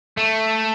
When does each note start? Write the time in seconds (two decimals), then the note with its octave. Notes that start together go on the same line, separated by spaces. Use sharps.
0.17 A3